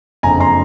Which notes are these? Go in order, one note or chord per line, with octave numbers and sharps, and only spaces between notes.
F#1 F2 D3 G#5 A#5
A#5 C6